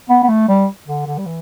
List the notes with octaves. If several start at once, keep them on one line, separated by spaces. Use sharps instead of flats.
B3
B3
A3
G3
D3
D3
G3
E3